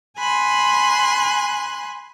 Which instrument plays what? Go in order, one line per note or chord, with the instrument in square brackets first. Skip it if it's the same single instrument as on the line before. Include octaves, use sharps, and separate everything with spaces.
[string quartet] G#5 B5 C6 F#6